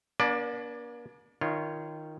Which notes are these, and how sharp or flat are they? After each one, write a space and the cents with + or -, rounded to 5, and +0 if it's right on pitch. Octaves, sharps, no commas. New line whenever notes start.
A#3 +40 D4 -30 D5 +20
D#3 +0 F4 -25 C#5 +0